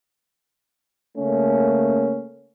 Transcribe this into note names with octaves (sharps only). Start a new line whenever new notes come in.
C#3 A3 A#3 C#4